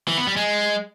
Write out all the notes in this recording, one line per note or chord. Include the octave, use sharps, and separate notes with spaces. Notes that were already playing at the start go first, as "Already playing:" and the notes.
E3
B3
G3
G#3